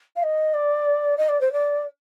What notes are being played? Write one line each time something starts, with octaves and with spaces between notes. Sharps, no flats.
F5
D#5
D5
D#5
D5
C5
D5